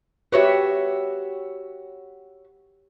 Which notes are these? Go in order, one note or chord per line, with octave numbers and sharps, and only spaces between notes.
F#4 G4 B4 C#5 E5